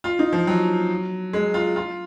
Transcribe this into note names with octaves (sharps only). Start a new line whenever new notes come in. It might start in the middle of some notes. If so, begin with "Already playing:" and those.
F4
D#4
F3
F#3
G#3
F4
F4